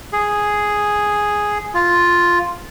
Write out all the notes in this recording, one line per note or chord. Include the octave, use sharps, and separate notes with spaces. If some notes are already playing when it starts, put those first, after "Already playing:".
G#4
F4